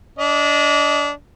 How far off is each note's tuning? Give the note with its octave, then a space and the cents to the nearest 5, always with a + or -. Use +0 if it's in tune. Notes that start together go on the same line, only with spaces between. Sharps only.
D4 -25 D#5 +0